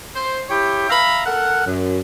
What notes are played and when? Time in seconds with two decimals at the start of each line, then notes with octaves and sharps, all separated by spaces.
0.15 C5
0.49 E4 G4 C#5 G5
0.90 E5 F5 A#5 B5
1.26 A4 A#4 F#5
1.66 F#2